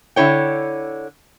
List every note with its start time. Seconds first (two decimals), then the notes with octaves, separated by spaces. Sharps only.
0.16 D3 E4 C#5 G5